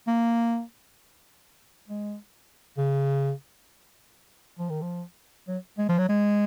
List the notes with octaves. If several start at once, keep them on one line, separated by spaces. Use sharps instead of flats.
A#3
G#3
C#3
F3
D#3
F3
F#3
G#3
F3
F#3
G#3